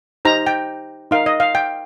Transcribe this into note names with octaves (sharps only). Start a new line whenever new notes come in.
D#4 G4 C5 A#5
G5
D#4 A#4 F5
D#5
F5
G5